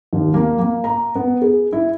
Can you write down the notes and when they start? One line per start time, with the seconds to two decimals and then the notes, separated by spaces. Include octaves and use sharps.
0.13 D#2
0.34 A#3
0.59 A#3
0.84 A#5
1.15 B3
1.42 G#4
1.73 E4